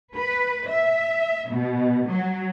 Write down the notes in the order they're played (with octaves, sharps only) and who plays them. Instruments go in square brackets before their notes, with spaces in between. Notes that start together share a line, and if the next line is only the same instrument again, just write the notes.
[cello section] B4
E5
B2
F#3